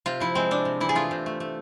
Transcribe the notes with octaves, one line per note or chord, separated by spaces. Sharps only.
C3 F4
F3 E4
G#3 C4
C3 D4
C3
E3 E4
G#4
A3 F4
C3
A3
A3